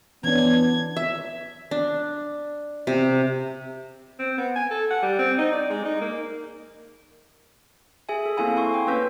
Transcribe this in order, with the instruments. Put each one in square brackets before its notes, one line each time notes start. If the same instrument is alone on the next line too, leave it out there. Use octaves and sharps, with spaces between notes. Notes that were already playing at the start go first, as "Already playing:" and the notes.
[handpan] E3 C#4 D4 [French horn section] B3 [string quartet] G#6
[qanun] E5
D4
C3
[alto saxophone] C4
B3
G#5
A4
F#5
G3
C4
D#4
D5
G#3
D#4
A#3
[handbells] G#4 E5 G#5
A4
A#3 C4 E4 F5 G#5 B5
G#5 C6 C#6
G5
A#3 C#4 B4 E6 G6 B6